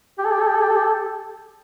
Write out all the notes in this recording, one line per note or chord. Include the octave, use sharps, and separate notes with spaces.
G4
A4
G4
A4
G4
A4
G4
A4
G4
A4